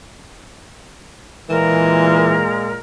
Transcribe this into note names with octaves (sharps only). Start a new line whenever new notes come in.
A#2 E3 G#3 A#4